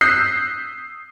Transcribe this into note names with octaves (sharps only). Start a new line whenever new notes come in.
D#6 E6 F#6 G6 B6 C7